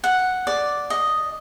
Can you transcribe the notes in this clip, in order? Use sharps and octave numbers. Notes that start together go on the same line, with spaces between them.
F#5
D5
D#5